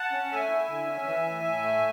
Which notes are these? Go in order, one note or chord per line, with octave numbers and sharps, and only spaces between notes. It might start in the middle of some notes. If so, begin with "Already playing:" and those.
Already playing: F#5 A5
C#4
A3 E5 G#5
E4
D3
C#4
E3
A2
A2
A3